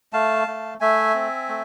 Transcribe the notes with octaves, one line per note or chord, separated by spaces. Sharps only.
A3 F5 A5
A3
A3 E5 G#5
C4
A3